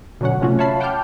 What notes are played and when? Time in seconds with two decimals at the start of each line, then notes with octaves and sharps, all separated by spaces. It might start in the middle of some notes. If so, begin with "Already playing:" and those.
0.21 B2 D3 F#3 C#4 F#5
0.40 C3 F3 A3 C#4 F4 F#4
0.59 C#5 E5 F5 A5 B5 C7
0.80 F#5 G5 A5 D6 F6 G6